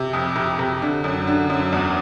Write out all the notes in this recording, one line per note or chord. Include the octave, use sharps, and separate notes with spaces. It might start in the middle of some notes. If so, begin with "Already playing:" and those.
Already playing: C3
F2
C3
C3
D3
F#2
D3
F#2
E2